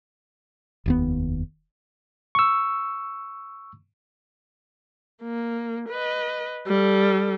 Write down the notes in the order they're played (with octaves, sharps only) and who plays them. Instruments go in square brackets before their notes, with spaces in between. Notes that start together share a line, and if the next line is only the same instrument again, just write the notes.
[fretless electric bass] F1 D#2 B3
[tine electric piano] C#6 E6
[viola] A#3
B4 D#5
G3 A4